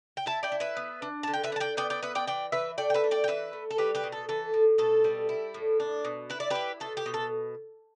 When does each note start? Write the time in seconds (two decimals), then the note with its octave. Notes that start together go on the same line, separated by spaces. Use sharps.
0.17 G5
0.26 E4 E5 A5
0.43 D5 G5
0.52 E4
0.60 B4 E5
0.77 B3
1.02 D4
1.23 D3 A5
1.33 G5
1.44 B4 E5
1.52 D4
1.56 A5
1.60 D5 G5
1.77 B3 D5 G5
1.90 D5 G5
2.03 B3 B4 E5
2.15 D5 G5
2.27 E3 D5 G5
2.52 E3 B4 E5
2.78 A3 D5 G5
2.90 G5
2.94 B4 E5
3.04 D4
3.11 D5 G5
3.24 G5
3.28 E3 B4 E5
3.53 A3
3.71 A4
3.78 G3 G4 B4
3.95 G4 B4
4.04 B2
4.12 A4
4.29 E3 A4
4.54 A2
4.78 B2 A4
5.04 G3
5.29 E4
5.54 A2
5.80 D4
6.05 B2
6.30 E4 B4
6.40 D5
6.50 E4 G4 B4
6.80 B2 A4
6.97 G4
7.06 B2
7.14 A4